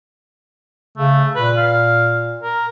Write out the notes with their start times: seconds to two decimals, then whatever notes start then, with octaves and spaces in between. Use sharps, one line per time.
0.98 C#3 A3
1.35 A#2 B4
1.57 F5
2.43 A#4